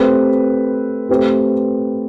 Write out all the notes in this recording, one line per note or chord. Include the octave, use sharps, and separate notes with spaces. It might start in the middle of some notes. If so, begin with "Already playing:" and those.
Already playing: A3 C4 G4 B4
A3 C4 G4 B4